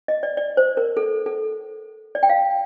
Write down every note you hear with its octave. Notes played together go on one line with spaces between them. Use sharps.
D#5
D5
D5
C5
A#4
A4
A4
D5
G5
F5